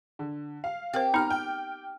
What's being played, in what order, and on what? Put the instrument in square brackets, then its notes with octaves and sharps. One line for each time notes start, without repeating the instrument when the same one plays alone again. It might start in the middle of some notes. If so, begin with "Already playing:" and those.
[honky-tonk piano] D3
F5
[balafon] C4 A#4 C5 [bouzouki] G4
[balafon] B3 D#4 [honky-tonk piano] A#5 F6
[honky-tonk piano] G5